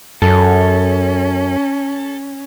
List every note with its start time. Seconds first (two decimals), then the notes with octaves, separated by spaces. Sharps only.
0.22 F#2 C#4 A4